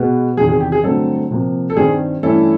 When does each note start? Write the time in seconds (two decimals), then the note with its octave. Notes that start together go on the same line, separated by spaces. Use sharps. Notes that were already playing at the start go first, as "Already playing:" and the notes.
Already playing: B2 G#3 B3
0.37 E2 C3 D#3 G#4
0.49 G#4
0.60 G4
0.72 G#4
0.84 G2 D3 F#3 A3 C4 A4
1.30 C3 F3 A#3
1.70 A4
1.76 G2 D#3 G3 C4 G#4
2.23 G2 E3 A3 C#4 E4 A4